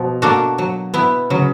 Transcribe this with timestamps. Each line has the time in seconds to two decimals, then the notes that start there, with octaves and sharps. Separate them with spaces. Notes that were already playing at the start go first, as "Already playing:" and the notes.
Already playing: B2 F3
0.22 A#3 D4 F#4 A4
0.58 F#3
0.94 B3 E4
1.30 C#3 F#3